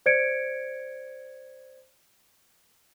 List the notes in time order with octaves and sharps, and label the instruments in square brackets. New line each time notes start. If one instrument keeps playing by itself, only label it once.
[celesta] C5 D5 G#6 C#7 D7